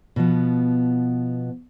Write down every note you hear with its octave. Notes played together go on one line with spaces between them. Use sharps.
B2 F3 B3